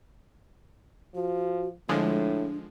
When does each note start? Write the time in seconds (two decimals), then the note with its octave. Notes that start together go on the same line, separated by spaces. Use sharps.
1.15 F3 F#4
1.89 A2 D3 F3 G#3 D4